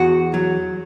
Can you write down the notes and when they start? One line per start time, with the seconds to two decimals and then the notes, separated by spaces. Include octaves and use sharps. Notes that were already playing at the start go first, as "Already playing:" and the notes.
Already playing: E2 F#4
0.34 F#3